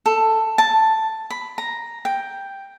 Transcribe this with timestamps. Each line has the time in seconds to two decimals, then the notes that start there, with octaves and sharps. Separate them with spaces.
0.06 A4
0.58 A5
1.30 B5
1.58 A#5
2.05 G5